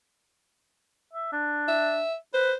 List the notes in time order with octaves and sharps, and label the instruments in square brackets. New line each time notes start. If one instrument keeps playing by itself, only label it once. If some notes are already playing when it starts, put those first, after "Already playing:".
[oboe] E5
D4
[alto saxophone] E5
[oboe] B4 [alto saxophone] C5